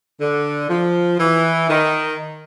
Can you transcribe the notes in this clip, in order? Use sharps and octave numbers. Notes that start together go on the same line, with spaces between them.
D3
F3
E3
D#3